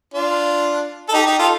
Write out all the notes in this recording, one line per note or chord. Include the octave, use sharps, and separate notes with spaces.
D4 F4
A4
D#4 G4
D#4 G4
F4 A4